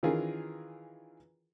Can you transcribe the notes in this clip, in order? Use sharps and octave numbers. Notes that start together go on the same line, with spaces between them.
D#3 E3 C#4 F4 G#4 A#4